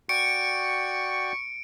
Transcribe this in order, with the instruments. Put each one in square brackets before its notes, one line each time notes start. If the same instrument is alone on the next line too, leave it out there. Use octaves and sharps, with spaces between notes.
[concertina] F#4 D5 G5 [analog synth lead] C#6 [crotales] C#7 D7